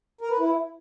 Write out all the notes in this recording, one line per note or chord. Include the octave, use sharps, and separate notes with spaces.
A#4
B4
E4